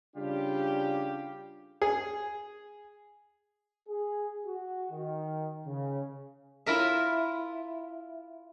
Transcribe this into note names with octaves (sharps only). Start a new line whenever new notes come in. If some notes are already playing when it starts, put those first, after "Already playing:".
C#3 G3 D4 F4 G4
G#4
G#4
F#4
D#3
C#3
E4 F4 A#4 E5